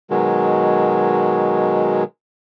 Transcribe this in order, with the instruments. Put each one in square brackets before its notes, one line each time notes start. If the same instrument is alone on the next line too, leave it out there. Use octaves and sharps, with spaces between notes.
[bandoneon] B2 D#3 F#3 G#3